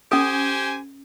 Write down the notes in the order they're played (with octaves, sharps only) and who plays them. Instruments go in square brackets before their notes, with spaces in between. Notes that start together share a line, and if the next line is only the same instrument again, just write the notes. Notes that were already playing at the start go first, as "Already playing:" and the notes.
[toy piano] C#4 A4 [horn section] G4 C5 G#5